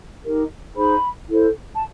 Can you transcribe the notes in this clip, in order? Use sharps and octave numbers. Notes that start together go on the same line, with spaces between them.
D#4 G4 A#4
D#4 G#4 C5 B5
E4 A4 C5
A5